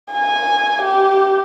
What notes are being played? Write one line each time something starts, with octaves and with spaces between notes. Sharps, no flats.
G#5
G4